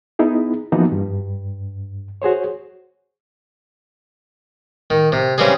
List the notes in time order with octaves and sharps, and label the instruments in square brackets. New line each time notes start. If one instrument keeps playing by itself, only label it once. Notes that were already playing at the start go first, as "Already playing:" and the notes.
[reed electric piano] B3 D#4 E4 G#4
E3 F3 A#3 B3 D#4 F#4
G2
F#4 G#4 C5 C#5
[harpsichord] D#3
C3
C#3 E3 G3 C4 G#4